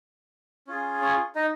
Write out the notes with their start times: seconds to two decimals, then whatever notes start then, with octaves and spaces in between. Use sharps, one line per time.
0.67 C#4 F4 G#4
1.02 C#4 C#5
1.35 D#4 D#5